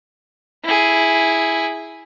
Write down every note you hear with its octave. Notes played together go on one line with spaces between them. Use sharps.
E4 G#4